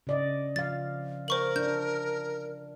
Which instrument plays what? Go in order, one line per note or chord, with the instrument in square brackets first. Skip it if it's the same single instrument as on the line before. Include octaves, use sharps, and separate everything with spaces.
[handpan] C#3 D5 D#5
[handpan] F3 F5 [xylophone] A6
[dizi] A#4 [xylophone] C5 C#6 F#7
[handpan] D4 [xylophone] G6